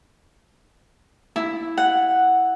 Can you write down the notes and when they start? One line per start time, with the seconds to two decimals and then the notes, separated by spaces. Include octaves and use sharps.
1.36 E4
1.77 F#5